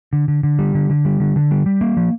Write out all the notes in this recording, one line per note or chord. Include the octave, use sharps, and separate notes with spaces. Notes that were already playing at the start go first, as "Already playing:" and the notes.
D3
D3
D3
G3
D3
D3
G3
D3
D3
G3
G3
A#3
F3